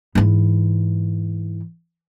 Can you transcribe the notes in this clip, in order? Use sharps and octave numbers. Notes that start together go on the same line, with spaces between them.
G#2 E3